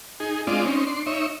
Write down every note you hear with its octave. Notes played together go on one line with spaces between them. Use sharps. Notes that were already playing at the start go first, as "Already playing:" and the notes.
D#4 G#4
G#3 C4 D4 F4 D5 D#5
C4 C#4 D#4
D4 C6
D#4 C#5 E5